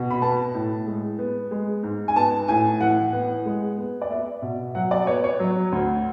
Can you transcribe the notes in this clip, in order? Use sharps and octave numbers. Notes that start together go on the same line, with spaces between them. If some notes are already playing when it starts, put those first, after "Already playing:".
Already playing: B2
B5
B3 A5
A2
G#3
B3
G#3
G#2
G#5
B3 A5
A2 G#5
E3 F#5
B3
G#3
B3
D5
B3 E5
B2
F#3 F#5
D5
B3 C#5
C#5
F#3
D2